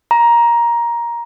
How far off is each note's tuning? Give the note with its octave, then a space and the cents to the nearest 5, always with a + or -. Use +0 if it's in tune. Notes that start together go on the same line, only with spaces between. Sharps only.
A#5 +15